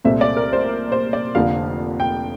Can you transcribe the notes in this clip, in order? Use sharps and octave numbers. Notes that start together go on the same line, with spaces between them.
C2 A#2 A3 C4 E5
D5
A#4
C5
C5
D5
F1 F2 D3 F3 A#3 F5
G5